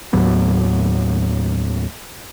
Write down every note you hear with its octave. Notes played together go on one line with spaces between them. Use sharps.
D#2 A2 F#3 B3